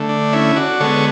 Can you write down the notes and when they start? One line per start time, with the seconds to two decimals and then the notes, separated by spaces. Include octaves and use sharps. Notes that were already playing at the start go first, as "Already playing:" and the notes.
Already playing: D3 A3
0.09 D4
0.33 C#4 E4
0.56 D4 F#4
0.80 D3 G#3 B3 A4 C#5